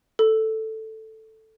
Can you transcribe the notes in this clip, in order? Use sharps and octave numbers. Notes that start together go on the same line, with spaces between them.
A4